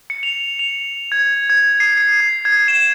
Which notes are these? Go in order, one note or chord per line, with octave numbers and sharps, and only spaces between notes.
C#7
F7
F7
G#6
G#6
C7
G#6
G#6
E7